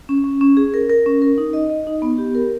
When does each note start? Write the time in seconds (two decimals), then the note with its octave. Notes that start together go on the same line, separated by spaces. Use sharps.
0.09 C#4
0.24 C#4
0.41 C#4
0.57 G#4
0.74 A#4
0.90 A#4
1.06 C#4
1.22 A#4
1.38 D#4
1.53 D#5
1.69 D#5
1.87 D#4
2.02 B3
2.18 G4
2.35 A#4